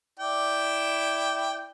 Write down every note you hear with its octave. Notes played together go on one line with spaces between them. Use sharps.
E4 D5 G5